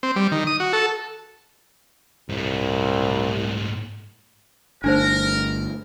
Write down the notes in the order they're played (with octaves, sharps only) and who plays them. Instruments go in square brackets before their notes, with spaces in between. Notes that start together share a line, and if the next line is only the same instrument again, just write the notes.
[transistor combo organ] C4
G3
D#3
D#6
F#4
A4
[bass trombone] C2 [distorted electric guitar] G#2 A3
[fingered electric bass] G1 A3 [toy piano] D4 D#4 C5 [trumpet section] A#4